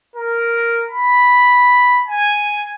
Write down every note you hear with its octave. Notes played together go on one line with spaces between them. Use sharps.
A#4
B5
G#5